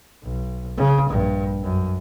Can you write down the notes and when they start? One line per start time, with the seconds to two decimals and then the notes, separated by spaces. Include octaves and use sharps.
0.23 B1
0.77 C#3
1.08 A#1 G2
1.63 F#2